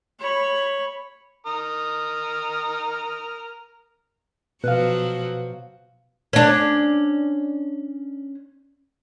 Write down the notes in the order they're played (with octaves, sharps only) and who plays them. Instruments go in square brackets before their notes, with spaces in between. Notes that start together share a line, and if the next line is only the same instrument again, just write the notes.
[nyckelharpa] C#5 B5
[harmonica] A#4 D#6
[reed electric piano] B2 F5 [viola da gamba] F3 F#3 F#4 [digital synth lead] B4
[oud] C#4 D4